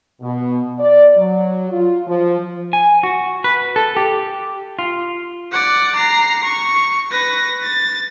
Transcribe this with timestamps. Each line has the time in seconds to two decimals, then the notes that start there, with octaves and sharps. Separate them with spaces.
0.22 B2
0.79 D5
1.17 F#3
1.71 F4
2.06 F3
2.73 G#5
3.03 F#4
3.44 B4
3.76 A4
3.97 G4
4.79 F4
5.52 D5 F#5
5.95 A#5 C7
6.45 C#6
7.11 B4 A#6
7.62 A6